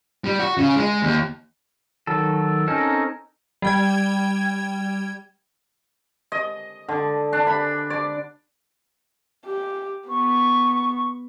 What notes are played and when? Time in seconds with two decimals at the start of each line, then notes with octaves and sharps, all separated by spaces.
0.24 G3
0.39 F#4
0.58 C#3
0.76 G#3
1.03 D#2
2.07 D#3 F#3 A4
2.68 C4 C#4 D#4 A4 A#4
3.62 G3 G5 G#6
6.32 D#5
6.88 D3
7.33 D4
7.47 B5
7.90 D5
9.46 G4
10.09 B3 C#6